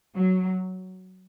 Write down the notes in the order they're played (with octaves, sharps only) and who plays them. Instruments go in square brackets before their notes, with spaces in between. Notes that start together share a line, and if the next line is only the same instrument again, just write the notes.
[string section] F#3